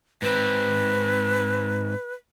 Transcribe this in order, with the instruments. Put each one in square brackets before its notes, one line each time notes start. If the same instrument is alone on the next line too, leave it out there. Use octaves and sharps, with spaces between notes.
[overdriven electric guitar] G#2 C4 [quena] B4